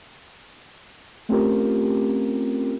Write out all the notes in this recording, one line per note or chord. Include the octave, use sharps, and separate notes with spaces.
A3 C4 C#4 F4 G4 A#4